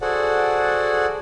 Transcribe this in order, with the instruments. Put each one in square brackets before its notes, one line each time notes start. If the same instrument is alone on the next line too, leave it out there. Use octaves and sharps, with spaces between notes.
[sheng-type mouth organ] F#4 G#4 A4 C5 D5 F#5